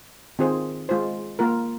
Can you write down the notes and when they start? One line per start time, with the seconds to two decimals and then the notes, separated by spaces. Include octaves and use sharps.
0.39 D#3 C4 F4 G#4 C5
0.89 G#3 F4 C5
1.39 A#3 F4 A#4